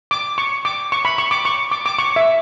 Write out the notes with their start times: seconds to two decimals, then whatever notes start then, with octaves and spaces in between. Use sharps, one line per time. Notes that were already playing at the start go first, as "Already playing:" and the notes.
0.11 D6
0.38 C#6
0.65 D6
0.92 C#6
1.05 B5
1.18 C#6
1.31 D6
1.45 C#6
1.71 D6
1.86 D6
1.98 C#6
2.16 E5